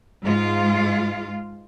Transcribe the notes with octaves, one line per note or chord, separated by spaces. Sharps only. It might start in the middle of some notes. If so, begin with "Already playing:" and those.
G#2 G#3 F4 F5